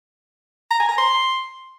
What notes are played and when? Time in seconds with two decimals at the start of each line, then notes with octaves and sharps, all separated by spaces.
0.71 A#5
0.80 G#5
0.89 A#5
0.98 C6